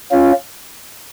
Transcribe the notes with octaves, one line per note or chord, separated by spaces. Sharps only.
C#4 F4